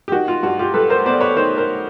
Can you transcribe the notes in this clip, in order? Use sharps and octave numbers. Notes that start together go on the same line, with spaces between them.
G4
D#3 F#4
F4
G2 F#4
F4 G4
G3 A4 B4
A#4 C5
B3 C5 D5
B4 C#5
D#3 A#4 C5
A#4 C5